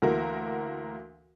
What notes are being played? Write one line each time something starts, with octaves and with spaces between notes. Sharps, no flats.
D2 E3 A#3 F#4 A#4 F5